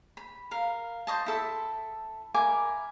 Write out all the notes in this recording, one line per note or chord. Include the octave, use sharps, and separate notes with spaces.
B5
A#4 F5
C5 C#5 D#5 A5
E4 A4 E5
E4 A#4 G#5 D6